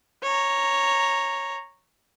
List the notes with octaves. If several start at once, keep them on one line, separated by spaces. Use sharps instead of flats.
C#5 A#5